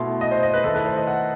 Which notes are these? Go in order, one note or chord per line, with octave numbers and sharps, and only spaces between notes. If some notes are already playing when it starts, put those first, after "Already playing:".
Already playing: B2 A3 E4 C6
D#5
C5
D#5
B4
D#3 A3 E4 A4
B4
C5
D#5
F#5